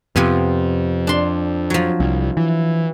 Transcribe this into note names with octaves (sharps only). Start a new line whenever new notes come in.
F2 C3 F3 B3
D4 C6
F3 F#3
C2
E3